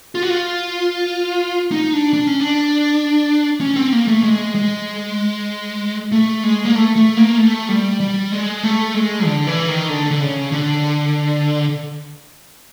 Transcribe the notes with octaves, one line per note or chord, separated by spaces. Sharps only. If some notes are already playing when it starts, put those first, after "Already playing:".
F4
F#4
F4
D#4
D4
D4
C#4
D4
C#4
C4
A#3
A3
G#3
G#3
A3
G#3
A#3
A3
A3
A#3
A3
G3
G3
G#3
A3
G#3
D3
E3
D#3
D3
D3
C#3
D3